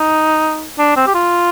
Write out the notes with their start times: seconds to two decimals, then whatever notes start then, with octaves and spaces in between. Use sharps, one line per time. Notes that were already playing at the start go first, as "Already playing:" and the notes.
Already playing: D#4
0.78 D4
0.96 C4
1.07 G4
1.15 F4